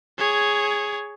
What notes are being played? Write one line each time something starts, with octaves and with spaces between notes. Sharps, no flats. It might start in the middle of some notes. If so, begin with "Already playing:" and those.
G#4 C#5